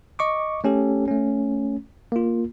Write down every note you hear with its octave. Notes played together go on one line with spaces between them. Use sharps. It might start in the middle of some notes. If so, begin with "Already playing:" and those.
D#5 C#6 D6
A3 C#4 G4 A4
A3 C#4
A#3 F4